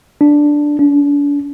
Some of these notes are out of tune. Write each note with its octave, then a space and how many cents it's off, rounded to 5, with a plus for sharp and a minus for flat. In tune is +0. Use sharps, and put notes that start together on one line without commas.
D4 +0
D4 -40